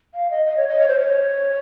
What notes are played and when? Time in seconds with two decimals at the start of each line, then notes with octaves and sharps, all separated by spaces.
0.14 F5
0.31 D#5
0.46 D#5
0.57 C#5
0.68 D#5
0.78 C#5
0.88 C5
0.99 C#5